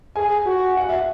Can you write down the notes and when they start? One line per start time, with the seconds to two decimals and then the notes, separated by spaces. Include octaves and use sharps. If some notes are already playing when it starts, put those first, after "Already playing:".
0.16 G#4 G#5
0.46 F#4
0.77 F#5
0.89 E5